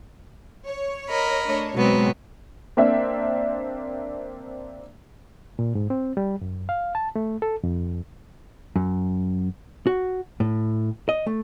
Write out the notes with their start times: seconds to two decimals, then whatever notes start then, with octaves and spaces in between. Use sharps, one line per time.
0.67 C#5
1.09 A#4 D#5 B5
1.45 A3 D4 C#5
1.74 B2 F#3 G#3 B3 C4
2.77 A#3 C4 D4 E5
5.59 A#2
5.75 G#2
5.90 C4
6.17 G3
6.41 F#2
6.69 F5
6.95 A5
7.16 A3
7.42 A4
7.64 F2
8.76 F#2
9.87 F#4
10.40 A2
11.09 D#5
11.26 A3